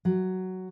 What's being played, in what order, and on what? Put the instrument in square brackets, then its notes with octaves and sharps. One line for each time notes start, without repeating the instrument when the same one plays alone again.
[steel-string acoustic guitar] F#3